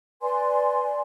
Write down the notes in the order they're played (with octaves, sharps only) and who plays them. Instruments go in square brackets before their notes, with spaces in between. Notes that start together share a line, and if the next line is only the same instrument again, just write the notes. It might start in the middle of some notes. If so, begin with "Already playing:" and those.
[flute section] B4 D5 G#5 C6